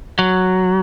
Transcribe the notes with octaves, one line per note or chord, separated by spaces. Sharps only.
F#3